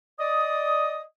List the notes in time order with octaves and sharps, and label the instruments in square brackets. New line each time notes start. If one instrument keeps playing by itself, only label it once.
[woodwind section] D5 D#5 D#6